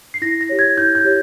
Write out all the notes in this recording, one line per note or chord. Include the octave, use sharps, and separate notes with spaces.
C7
E4 A#6
A#6
G4 C#5
G#6
E4 G6
G6
G4 C#5